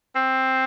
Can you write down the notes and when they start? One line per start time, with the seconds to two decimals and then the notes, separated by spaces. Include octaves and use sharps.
0.16 C4